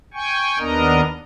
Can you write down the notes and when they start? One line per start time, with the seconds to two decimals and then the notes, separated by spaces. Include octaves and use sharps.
0.14 G5 G#5 C#6
0.59 D#2 B3 D4 A#4 D#5 A#5